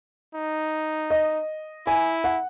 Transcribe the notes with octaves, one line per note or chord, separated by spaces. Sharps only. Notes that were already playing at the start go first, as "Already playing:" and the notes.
D#4
D#5
E4 G#5
F#5